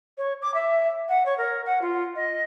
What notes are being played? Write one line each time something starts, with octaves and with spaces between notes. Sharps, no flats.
C#5
D6
E5
F#5
C#5
A#4
F#5
F4
D#5